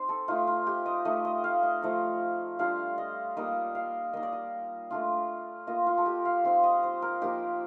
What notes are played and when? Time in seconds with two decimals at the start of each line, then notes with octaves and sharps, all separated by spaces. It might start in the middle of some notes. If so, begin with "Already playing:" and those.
Already playing: C4 D#4 C5
0.09 A4
0.28 A3 D#4 F4
0.47 F4
0.67 G4
0.86 D#5
1.05 A3 D#4 D#5
1.25 D#5
1.44 F5
1.63 D#5
1.82 F3 A3 D#4
2.59 G3 D4 F4 F5
2.98 D#5
3.37 G3 A#3 D#4 D#5
3.75 F5
4.13 A#3 D#4 D#5
4.23 D5
4.33 D#5
4.91 A3 D4 F4
5.67 A#3 F4 D#5
5.86 F4
5.98 A4
6.06 G4
6.25 F5
6.44 F3 C4 D#4 F5
6.63 D#5
6.83 C5
7.02 A#4
7.21 F3 A#3 D#4 G4